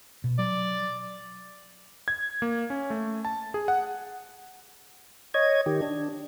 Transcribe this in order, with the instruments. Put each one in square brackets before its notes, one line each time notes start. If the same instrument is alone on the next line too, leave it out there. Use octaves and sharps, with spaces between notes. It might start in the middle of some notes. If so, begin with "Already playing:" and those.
[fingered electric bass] B2
[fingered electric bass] F#3 [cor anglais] D5
[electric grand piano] G#6
A#3
C#4
A3
A5
G#4
F#5
[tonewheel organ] C#5 D#5 G#6
D#3 G4
D4